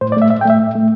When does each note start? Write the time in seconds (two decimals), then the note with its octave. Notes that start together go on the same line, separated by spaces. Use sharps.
0.01 A2 C5
0.12 D5
0.17 A3 E5
0.30 A2 E5
0.41 G5
0.45 A3 E5
0.59 A2
0.75 A3